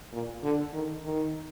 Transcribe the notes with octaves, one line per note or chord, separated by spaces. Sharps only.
A#2
D3
D#3
D#3